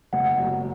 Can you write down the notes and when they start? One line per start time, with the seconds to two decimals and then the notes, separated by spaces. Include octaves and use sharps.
0.13 F#1 F#5
0.39 F#2 F#3